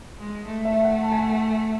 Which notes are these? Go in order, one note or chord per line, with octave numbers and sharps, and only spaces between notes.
G#3
A3
E5
F#5
A5
G#5
F#5
G#5